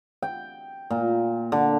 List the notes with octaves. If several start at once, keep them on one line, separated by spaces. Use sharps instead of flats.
G5
A#2
D3